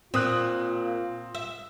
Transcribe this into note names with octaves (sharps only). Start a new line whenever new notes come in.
A#2 C4 F4 D#6 F#6
E5